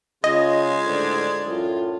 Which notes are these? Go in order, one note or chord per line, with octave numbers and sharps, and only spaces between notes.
C#3 G#3 F4 D#5
A2 D3 C5 D5
F#2 A2 F4